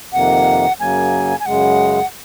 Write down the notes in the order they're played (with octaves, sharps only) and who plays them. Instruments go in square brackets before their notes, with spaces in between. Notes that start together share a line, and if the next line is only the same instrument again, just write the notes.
[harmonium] F2 C3 D#3 A#3 [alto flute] F#5
[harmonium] F#2 C#3 F#3 A#3 [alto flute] G#5
[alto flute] G#5
[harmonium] F#2 C#3 G#3 [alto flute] F#5